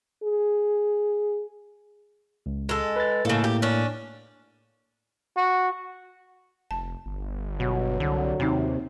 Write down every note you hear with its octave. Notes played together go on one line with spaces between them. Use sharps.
G#4
C#2
G#3 A4
B4 A6
A2 C#3 A#3 A4
G4
C#4 D4
F#4
F1 A5
G1
B2 F#3
C2 D3
D#2 C3 C4 D#4